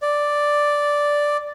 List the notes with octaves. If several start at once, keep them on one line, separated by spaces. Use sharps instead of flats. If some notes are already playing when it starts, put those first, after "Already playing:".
D5